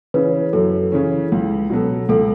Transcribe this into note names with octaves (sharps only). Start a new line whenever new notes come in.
C#3 E3 C#4 B4
F#2 A4
C#3 E3 C#4
C#2
B2 F#3 B3 A4
C#2 A4